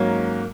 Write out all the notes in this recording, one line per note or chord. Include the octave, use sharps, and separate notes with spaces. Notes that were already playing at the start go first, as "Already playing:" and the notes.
Already playing: G#2 F#3 A#3 C#4